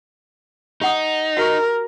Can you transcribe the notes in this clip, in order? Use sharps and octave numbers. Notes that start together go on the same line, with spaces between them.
D#4 G4 F#5 D#6
F#4 G4 A#4